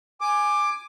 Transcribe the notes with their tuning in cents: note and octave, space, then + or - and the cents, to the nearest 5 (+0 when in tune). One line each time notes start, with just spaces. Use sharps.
G#5 +0 D6 +15